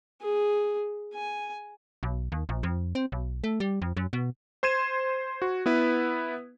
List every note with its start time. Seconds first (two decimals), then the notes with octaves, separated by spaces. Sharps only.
0.21 G#4
1.14 G#5
2.03 B1
2.32 D#2
2.49 A#1
2.63 F2
2.95 C4
3.12 B1
3.44 A3
3.60 G3
3.82 F2
3.97 F#2
4.13 B2
4.63 C5 C6 G#6 D#7 E7
5.42 F#4
5.66 B3 E4 B4